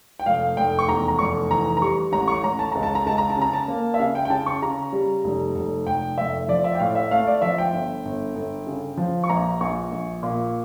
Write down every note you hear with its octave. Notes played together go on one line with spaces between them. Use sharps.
G5
F1 F5
F1 G5
C#6
E2 A#5
A#5
F1 C#6
E3 A#5
A#5
G3 C#6
A1 A#5
C#6
A1 A#5
A5
C#2 A#5
A5
A#5
C#2 A5
A#5
A5
C#3 A#5
A5
A#3
E5
C#3 F5
G5
G5
C#3 A5
C#6
C#3 A#5
G3
F1
F1
F1 G5
F1 E5
F3 D5
E5
G5
A2 F5
E5
A3 F5
D5
F3 E5
G5
G1
G1
G1
C#3
F3
C#6
A#1 A#5
A#1 C#6
A#1
A#2